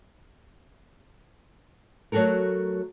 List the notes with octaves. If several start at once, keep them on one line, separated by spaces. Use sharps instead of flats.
F#3 A3 F#4 A4 A#4